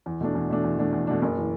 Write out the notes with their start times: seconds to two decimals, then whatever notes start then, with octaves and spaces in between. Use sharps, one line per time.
0.06 E2
0.21 B2 A3 D4
0.35 E2
0.50 B2 A3 D4
0.64 E2
0.78 B2 A3 D4
0.93 E2
1.07 B2 A3 D4
1.22 F#1
1.38 E3